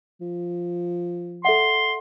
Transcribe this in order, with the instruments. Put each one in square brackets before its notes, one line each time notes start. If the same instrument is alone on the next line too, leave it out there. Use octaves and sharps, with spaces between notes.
[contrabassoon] F3
[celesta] A4 E5 F#5 [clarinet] C6